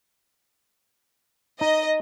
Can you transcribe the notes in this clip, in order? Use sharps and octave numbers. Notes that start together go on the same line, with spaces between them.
D#4 D#5